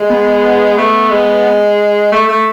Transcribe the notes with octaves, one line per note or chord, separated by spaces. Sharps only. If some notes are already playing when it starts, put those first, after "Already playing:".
Already playing: G#3
B3
A3 B3
G#3
A3
A3